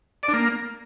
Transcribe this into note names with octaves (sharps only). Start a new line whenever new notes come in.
D5
D4
A#3